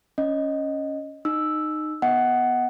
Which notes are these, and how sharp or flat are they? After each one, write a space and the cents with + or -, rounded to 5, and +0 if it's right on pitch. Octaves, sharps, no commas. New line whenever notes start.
C#4 +0 D#5 +0
D#4 -20 E6 +0
B3 +0 D#5 +35 F#5 +10